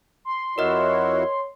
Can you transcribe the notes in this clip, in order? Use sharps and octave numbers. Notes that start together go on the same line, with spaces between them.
C6
F2 E4 F#4 A#4 C#5 D#5 F6